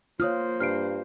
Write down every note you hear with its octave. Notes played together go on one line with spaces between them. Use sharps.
A#3 F4 C5 C#5 D#6 F6
G2 F6 C7 D7